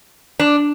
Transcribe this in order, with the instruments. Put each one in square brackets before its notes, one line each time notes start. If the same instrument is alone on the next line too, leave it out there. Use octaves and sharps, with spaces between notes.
[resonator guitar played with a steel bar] D4